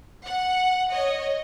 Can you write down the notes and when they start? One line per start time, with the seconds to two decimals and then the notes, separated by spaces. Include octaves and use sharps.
0.24 F#5
0.91 C#5 D#5